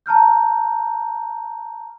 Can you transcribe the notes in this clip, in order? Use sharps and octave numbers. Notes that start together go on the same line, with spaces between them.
A5 A#5 F6 G6